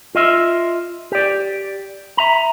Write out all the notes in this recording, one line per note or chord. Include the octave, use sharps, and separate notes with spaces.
F4 D#5 E5
G4 D5
E5 A#5